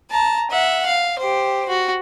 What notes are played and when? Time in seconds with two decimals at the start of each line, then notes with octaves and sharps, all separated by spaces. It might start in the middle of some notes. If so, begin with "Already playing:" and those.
0.11 A5 A#5
0.51 E5 F#5
0.86 F5
1.19 G4 C5
1.69 F#4